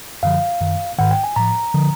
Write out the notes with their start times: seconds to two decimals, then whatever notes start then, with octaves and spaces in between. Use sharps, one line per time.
0.23 F#2 D3 F3 F5
0.60 F#2 D#3
0.98 G#2 D#3 F#5
1.11 G5
1.24 G#5
1.36 A2 F3 A#5
1.74 D3 F3